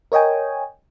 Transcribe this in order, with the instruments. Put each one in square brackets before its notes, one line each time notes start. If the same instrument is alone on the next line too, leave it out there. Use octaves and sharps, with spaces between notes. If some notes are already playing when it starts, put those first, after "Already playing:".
[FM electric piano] A#4 C#5 D#5 G5 G#5